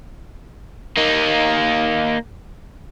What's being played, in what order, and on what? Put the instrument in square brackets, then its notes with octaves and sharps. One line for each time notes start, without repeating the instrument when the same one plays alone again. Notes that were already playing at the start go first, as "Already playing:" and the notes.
[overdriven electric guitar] A#3 D#4